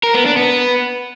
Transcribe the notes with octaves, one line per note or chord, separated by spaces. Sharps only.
A#4
B3
D4
B3